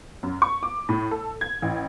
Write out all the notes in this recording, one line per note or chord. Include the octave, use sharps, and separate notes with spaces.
F#2
C#6
D6
A2
A4
G#6
A1